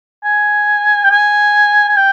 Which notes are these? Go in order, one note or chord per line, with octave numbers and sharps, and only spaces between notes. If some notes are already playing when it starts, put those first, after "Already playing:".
G#5
G5
G#5
G#5
G5